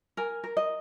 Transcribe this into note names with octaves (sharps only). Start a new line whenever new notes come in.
A#4 G#5
A#4
D#5